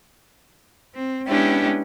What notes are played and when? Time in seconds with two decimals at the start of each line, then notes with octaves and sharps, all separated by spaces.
0.94 C4
1.27 G#3 B3 C#4 D4 E4 G4